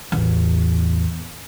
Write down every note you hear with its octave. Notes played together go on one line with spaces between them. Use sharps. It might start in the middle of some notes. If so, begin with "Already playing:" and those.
A1 E2